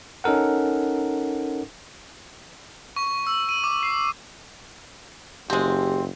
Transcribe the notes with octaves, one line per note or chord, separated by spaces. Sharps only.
C#4 D#4 A4 A#4 F#5
C#6
E6
D#7
D6
C7
F#1 G#3 C4 G4